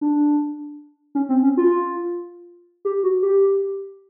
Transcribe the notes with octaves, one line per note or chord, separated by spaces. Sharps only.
D4
C#4
C4
C#4
F4
G4
F#4
G4